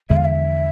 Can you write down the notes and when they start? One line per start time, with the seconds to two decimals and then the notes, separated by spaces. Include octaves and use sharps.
0.09 E2 D3 F3 G#3 E5
0.16 F5
0.25 E5